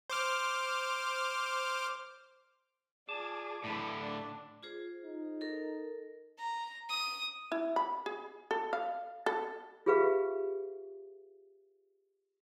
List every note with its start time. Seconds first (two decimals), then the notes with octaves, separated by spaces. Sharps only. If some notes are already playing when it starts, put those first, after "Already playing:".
0.10 C5 D6 F6
3.09 F4 G#4 D5 A5 D6
3.64 A2 D3 E3 B5
4.01 D4 D5
4.63 F4 G#4 C5
5.05 D#4
5.41 A4 A#4
6.38 A#5
6.89 D#6
7.52 E4
7.76 B5
8.06 G#4
8.51 A4
8.73 F5
9.26 A4
9.86 F4 G4 G#4 B4 E5 F5